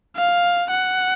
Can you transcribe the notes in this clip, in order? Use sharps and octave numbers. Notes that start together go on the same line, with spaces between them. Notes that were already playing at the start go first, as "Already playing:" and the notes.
F5
F#5